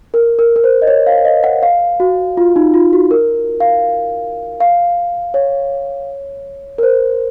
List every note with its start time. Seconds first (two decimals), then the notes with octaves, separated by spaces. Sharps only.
0.14 A#4
0.39 A#4
0.56 A#4
0.64 C5
0.82 D#5
0.87 C#5
1.07 F5
1.25 D#5
1.44 F#5
1.63 F5
2.00 F#4
2.37 F4
2.56 D#4
2.74 F4
2.93 F#4
3.11 A#4
3.60 F5
4.60 F5
5.34 C#5
6.78 A#4
6.83 C5